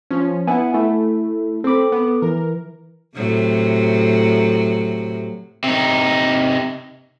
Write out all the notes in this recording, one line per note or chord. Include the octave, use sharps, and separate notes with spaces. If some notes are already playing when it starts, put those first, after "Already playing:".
F3 C#4
B3 E4 F#5 G#5
A3 E4
C4 A4 B5 D6
B3
E3 A#4
A2 C3 F#3
C3 D#4